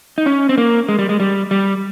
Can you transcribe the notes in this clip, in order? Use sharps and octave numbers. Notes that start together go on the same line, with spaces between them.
D#4
C#4
C4
A#3
G#3
G3
G#3
G3
G3